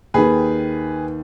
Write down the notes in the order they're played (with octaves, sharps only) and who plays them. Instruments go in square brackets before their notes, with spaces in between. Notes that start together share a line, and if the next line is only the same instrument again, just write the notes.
[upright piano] D#2 D#3 G#4 B4